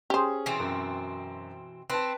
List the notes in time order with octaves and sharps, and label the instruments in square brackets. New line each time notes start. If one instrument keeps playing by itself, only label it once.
[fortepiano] C#4 G#4 [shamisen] G4 C5
[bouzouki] B2 E3 C4
[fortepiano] F#2
[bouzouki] C4 [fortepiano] B4 A5